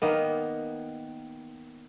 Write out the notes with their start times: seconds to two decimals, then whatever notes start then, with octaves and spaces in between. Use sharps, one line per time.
0.02 D#3 A#3 B3